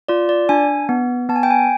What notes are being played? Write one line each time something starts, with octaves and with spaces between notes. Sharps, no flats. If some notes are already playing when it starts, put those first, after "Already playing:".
F4 D5
D5
D4 G#5
B3
B3 A5
G#5
G5
G#5